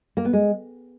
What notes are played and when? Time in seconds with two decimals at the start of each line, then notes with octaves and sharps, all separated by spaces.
0.17 A#3
0.25 B3
0.33 G#3